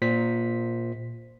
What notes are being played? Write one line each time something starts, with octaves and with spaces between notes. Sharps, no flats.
A#2 C5 B6